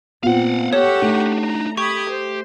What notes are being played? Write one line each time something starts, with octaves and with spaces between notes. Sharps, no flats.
A#2 B3 C4 F4 F5 F#5
G4 A4 C#5 F#5 C#6
A3 D4 D#4
A#5
G4 B5 C#6 D#6 G#6
C5